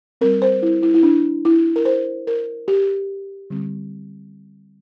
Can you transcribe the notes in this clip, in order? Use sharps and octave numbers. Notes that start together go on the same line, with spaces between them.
G3 C4 A#4
C5
E4
E4
E4
D4
E4
A#4
C5
A#4
G4
D3 G3 C4